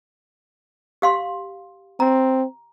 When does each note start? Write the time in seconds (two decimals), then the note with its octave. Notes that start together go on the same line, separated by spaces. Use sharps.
1.02 G4 F5 C6
2.00 C4 A#5